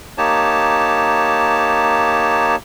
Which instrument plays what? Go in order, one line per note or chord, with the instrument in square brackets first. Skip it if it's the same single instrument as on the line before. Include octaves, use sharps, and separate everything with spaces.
[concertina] A#3 D#4 G4 C#5 A5